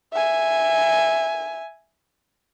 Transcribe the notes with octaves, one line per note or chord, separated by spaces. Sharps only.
E5 G#5